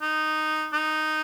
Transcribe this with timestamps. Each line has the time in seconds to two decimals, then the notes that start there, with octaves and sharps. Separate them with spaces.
0.02 D#4
0.73 D#4